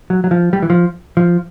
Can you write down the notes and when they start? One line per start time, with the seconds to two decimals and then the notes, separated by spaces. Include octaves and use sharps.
0.10 F#3
0.24 F#3
0.31 F3
0.53 G3
0.62 E3
0.70 F3
1.17 F3